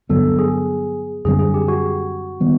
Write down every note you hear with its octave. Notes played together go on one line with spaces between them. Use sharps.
G2 D3 F#3 B3 A4
G#4
F#2 D3 G3 C4 G#4
G#4
G4
F#4
D#3 G3 B3